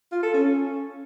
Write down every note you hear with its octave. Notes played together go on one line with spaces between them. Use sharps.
F4
A4
C#4